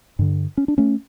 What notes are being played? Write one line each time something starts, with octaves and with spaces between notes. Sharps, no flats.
G2 D3
C#4
D4
A3 C#4